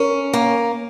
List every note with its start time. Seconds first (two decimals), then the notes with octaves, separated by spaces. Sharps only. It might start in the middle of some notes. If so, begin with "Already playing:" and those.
Already playing: C#4 A#4
0.33 A#3